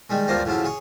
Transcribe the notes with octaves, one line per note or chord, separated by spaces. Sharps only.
D#3 G3 G#3
D2 G2 F3 A#3 C5 A#5
A2 C#3 F3 F#3 E4
G#4 C#5